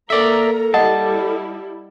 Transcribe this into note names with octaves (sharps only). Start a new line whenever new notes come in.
A#3 A4 A#4 D5 E5 A#5
G3 E4 D#5 F#5 A5 D#6